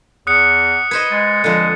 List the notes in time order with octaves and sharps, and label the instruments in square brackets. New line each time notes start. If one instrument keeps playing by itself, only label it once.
[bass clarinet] E2 [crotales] D#6 F#6 C#7
[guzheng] B4 C5 D#5 [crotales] G#6
[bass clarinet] G#3 [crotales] A6
[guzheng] F2 D3 [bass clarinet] G#3